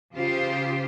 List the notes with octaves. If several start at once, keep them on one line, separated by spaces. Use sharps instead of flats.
C#3 F4 G4 C5